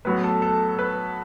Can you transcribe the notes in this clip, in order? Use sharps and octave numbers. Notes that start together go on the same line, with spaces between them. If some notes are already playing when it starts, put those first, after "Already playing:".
A2 F#3 B3 B4
A4
A4
B4